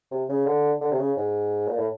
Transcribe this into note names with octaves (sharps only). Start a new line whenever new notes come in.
C3
C#3
D3
D3
C3
C#3
G#2
A#2
A2